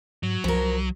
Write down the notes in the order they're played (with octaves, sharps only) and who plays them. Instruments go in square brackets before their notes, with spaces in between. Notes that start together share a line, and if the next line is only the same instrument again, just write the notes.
[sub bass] G#2 [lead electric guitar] F#3
[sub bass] C2 [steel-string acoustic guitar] F3 A#4